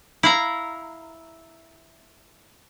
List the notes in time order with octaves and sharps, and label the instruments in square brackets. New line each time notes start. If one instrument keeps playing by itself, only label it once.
[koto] E4 F5 A#5